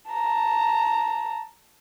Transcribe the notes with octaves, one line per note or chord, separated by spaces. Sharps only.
A5 A#5